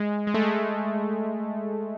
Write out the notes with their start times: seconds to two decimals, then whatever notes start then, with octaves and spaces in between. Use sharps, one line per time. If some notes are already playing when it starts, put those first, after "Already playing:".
Already playing: G#3
0.27 G#3
0.34 A3
0.42 G#3